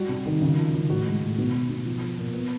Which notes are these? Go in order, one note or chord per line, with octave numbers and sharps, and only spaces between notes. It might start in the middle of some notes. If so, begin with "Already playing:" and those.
Already playing: G3 F#4
C3
D#3
C#3
F3
C#3
A2 F#4
G#3
A2
B2
B2
B2
F3
F3
A#2
B3